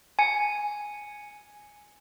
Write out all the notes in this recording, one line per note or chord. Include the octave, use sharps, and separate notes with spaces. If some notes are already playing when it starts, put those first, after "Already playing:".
G#5 C#7